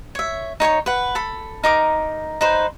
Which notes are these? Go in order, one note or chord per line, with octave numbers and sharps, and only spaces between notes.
C#5 E5
D#4 C#5 G#5 C#6
B4 F#5
A4 B5
D#4 A#4 D6
D#4 B4 C5